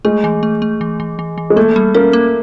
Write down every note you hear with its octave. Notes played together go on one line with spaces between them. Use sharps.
G#3 A3
E3
A3
A3
E3
E3
E3
E3
G#3
A3 A#3
G3
A#3 C#4
A#3